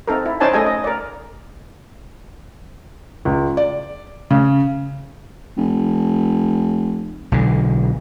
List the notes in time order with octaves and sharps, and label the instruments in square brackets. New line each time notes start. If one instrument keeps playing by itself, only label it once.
[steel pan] C4 D#4 A4 A#4
E4
C#4 D#4 C5 D5 G#5 A5
A3 G#4 A4 D#5 G#5
D#5
A#4 D5
[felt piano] C#2
D5
C#3
[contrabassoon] F1
[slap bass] B1 D3